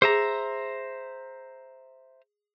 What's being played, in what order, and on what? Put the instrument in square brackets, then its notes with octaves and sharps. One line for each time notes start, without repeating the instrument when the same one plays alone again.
[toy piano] G#4 [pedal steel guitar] C5 E5 A#5